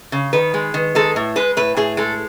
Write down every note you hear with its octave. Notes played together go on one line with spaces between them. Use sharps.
C#3
D#3 B4
G#3
D#3
G#3 A4
A2
G#3 B4
A2 B4
A2 G#4
G#3 A4